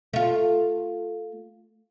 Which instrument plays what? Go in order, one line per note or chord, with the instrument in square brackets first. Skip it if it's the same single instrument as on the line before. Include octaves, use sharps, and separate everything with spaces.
[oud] A3 F4